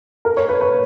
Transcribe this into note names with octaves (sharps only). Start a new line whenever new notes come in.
A#4
C#5
B4
B4